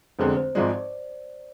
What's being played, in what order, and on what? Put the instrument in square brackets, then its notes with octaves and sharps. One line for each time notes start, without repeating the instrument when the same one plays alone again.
[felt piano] F1 E2 D3 G#3 C4 [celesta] C5
[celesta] C5
[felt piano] G#1 G#2 F3 G#3 [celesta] D5